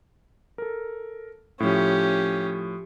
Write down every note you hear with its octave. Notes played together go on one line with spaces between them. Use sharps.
A4 A#4
A2 F3 C#4 G4